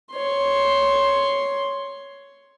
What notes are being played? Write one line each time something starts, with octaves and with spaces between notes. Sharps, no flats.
C#5 C6